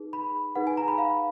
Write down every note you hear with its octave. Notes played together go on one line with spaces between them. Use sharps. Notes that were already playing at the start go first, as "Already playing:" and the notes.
Already playing: D#4 G#4 B4
B5
D#4 G#4 B4 F#5
G#5
A#5
B5
F5